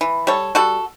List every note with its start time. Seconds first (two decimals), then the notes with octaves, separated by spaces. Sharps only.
0.01 E3
0.27 G3 A4 C#5
0.55 G3 F#4 A4